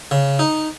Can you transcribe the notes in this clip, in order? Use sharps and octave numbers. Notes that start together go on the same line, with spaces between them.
C#3
D#4